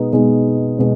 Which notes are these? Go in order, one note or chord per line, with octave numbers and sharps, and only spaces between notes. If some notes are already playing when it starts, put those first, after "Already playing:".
Already playing: B2 G#3 B3 D#4
B2 G#3 B3 D#4
B2 G#3 B3